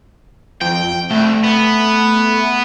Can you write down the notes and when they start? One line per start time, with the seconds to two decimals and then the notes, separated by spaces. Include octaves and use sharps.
0.61 F2 G5
1.11 C2 A3
1.44 B3